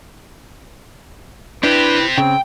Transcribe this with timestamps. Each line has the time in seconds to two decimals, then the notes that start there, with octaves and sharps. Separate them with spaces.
1.64 C4 D4 E4 G4 B4
2.18 C#3 C4 G5